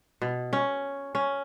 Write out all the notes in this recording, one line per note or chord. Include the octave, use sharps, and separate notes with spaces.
B2
C#4
C#4